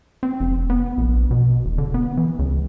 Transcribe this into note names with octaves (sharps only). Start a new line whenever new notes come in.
C4
F1
B3
A#1
B2
E1
D3
B3
E3
C#2